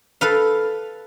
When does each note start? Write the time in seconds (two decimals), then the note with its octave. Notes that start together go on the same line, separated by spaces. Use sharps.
0.21 A4 B4 F5